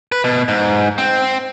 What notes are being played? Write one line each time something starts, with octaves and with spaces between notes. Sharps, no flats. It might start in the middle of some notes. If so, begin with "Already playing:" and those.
B4
B2
G#2
C4